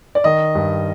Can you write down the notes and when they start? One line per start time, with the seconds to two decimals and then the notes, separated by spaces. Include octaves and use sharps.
0.15 D5
0.24 D#3 D#5
0.55 G2